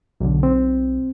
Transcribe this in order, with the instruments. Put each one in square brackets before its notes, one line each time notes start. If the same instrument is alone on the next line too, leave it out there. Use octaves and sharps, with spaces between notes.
[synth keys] B1 [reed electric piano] E2 B2 D3
[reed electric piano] C4